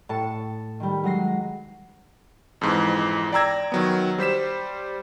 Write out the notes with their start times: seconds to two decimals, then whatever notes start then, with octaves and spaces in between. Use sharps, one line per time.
0.09 A2 A5 C#7 E7
0.80 D#3 G3
1.04 F#3 G#3 A#6 C7
2.61 F2 G#2 E3
3.32 D5 G5 A#5 E6 G#6 A#6
3.72 D#3 F#3 B3
4.18 G3 C5 B6 E7